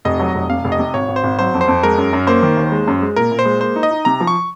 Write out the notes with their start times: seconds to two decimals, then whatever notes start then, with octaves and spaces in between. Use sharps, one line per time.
0.05 F1 D#5
0.19 F#3
0.35 F1
0.50 C3 F5
0.64 F1
0.72 D#5
0.79 C3
0.94 G#1 C#5
1.08 G#1
1.16 C5
1.24 G#1
1.39 F#3 C5
1.54 F2
1.61 C5
1.68 F2
1.83 G#3 A#4
1.98 F#2
2.13 F#2
2.27 A#3 C5
2.43 D#3
2.57 D#2
2.72 G#3
2.87 F#2
3.02 G#3
3.16 A#2 A#4
3.32 A#2
3.39 C5
3.45 G#3
3.61 A#3 C5
3.76 D#4
3.83 D#5
3.91 D#4
4.05 C3 A#5
4.20 F3
4.27 C#6